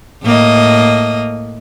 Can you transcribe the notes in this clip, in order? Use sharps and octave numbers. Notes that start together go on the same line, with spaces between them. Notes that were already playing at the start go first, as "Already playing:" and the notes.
A2 A#3 D#5